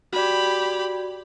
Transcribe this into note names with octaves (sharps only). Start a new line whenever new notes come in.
F#4 G4 D5 B5